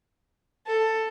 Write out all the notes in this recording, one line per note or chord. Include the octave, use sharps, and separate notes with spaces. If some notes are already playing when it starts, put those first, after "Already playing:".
A4